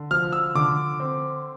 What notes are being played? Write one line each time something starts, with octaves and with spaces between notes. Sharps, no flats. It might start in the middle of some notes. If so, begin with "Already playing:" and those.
Already playing: D3
F3 F6
E6
D3 D6
C4